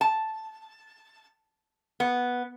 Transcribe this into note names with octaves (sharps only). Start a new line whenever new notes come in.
A5
B3